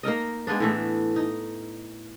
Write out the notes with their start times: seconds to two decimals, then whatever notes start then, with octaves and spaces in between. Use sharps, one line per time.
0.03 A#3 D#4 A#4 D#5
0.47 G#3 A#3 B3 D4
0.60 A2 E3 A3
1.16 D#4